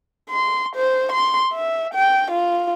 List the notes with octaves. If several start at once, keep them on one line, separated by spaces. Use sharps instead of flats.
C6
C5
C6
E5
G5
F4